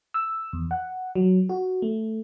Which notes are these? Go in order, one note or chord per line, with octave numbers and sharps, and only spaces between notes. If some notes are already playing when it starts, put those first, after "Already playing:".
E6
E2
F#5
F#3
F#4
A3